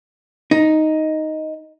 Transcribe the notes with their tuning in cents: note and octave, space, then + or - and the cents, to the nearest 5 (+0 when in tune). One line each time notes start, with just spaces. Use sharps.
D#4 +5